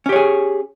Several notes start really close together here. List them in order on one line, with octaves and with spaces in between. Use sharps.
C#4 G4 C#5 G#4